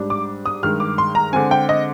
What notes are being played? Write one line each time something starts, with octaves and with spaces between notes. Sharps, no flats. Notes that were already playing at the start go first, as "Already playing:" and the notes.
Already playing: G#2 G3 D4
D6
D#6
G2 D#3 G#3 F6
D6
C6
A#5
D3 G#3 C4 G#5
G5
D#5